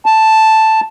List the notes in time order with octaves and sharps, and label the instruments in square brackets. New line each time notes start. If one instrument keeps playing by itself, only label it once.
[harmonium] A5